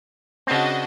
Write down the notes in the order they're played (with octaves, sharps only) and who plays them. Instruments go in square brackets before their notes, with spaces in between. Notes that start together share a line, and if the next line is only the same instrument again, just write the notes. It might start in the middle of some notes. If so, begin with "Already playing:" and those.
[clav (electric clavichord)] C#3 C4 [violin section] D4 F#4 D#5